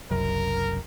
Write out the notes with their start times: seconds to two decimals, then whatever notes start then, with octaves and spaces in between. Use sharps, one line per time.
0.11 F#1 C2 F#2 A#4